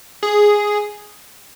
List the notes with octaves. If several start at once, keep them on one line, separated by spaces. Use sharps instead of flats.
G#4